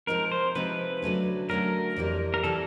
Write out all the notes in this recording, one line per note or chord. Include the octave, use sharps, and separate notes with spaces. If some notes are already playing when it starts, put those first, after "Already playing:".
C3 F3 G#3 C4 D#4 A#4
C5
C3 F3 G#3 C4 D#4 B4
D3 F#3 A3 C#4
D3 F#3 A3 C#4 A#4
F2 C3 E3 G3
A#4
C3 E3 G3 A4